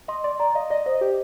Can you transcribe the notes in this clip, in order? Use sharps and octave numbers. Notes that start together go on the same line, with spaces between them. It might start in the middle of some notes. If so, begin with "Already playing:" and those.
D#5 C6
D5 C6
D5 A#5
D#5 F5
D5 D#5
C5 D#5
G4